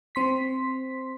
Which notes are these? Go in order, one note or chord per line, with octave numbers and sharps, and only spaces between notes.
C4 C6 B6